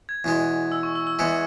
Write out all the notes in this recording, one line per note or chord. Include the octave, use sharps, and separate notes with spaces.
G#6
E2 B2 G#3
E6
C#6
E6
E6
E2 E3 G#3 G#6 C#7